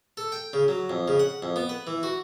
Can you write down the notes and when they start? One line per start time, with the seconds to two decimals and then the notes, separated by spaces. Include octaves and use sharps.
0.17 A4
0.32 G5
0.53 C#3
0.68 F#3
0.90 F2
1.08 C#3
1.20 F#5
1.42 F2
1.56 B3
1.69 B4
1.87 E3
2.03 F#4